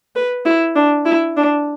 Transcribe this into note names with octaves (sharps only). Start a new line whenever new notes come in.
B4
E4
D4
E4
D4